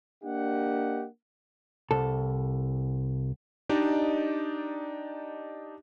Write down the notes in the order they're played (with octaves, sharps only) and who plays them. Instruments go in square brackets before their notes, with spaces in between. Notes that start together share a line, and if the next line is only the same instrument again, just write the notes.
[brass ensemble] A#3 D4 G4 D#5 F#5
[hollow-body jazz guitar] C2 A4
[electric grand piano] D4 D#4 G4 D5 D#5